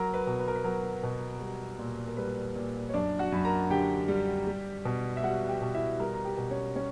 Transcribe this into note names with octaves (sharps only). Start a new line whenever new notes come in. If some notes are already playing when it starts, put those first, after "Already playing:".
Already playing: F#3 A#4 A#5
B4
B2
B4
A#4
B4
F#3 A#4
B2
G3
A#2
A#4
G3 B4
A#2
C#5
F#2 D4 D5
F#4 F#5
F#2 B5
A#4 A#5
D3 G4 G5
G3
G3
B2
E5
G3 F#4 F#5
G4 G5
B2
E4 E5
G3 A#4 A#5
A#5
G4 G5
B2
C#4 C#5
G3 C#4 C#5